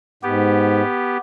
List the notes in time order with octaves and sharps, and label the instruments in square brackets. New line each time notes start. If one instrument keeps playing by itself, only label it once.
[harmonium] G#2 [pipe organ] B3 G4